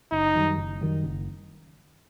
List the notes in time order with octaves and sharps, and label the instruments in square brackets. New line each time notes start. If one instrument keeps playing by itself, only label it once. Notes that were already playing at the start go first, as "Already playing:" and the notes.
[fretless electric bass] F#1 [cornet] D#4
[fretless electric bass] F#2 D#3 G3
F#1
F#2 D#3 G3
F#1